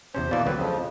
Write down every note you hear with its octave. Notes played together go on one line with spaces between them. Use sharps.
E2 C3 C#4 C5
B2 E3 A#3 D5
D2 D3 F#3 C4 B4
F2 C#3 F3